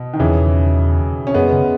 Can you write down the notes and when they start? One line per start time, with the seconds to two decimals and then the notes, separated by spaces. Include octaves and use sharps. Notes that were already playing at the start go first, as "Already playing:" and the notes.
Already playing: B2
0.14 D#3
0.19 E2 C#3 E3
1.27 C#4
1.34 F#2 G#3 B3
1.52 C#3